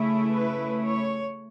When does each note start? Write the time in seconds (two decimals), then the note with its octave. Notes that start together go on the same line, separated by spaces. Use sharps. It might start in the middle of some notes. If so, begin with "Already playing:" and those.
Already playing: C#3 A3 E4
0.33 B4
0.86 C#5